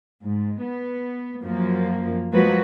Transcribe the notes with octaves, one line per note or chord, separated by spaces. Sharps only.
G#2
B3
F#2 F3 A#3
F3 F#3 G#3 A#3 F#4 B4